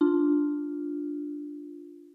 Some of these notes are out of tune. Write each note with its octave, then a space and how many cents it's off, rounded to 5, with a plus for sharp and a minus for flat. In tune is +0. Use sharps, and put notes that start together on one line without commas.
D4 +0 F4 +0